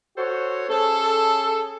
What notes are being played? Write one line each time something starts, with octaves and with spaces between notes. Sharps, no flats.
F#4 A4 C5 C#5
C#4 G#4 A4